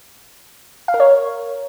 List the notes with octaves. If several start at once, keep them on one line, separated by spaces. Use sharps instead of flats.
F5
A#4
C#5